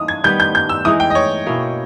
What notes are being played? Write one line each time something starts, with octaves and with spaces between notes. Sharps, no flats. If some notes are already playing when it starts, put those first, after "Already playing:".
Already playing: E3 A#3 D#4 D#6
G#6
D#3 G3 B3 G6
G6
G6
E6
E3 G#3 D#4 G#4 D#6
G5
D#5
C#5
B2 A#3 C#4 E4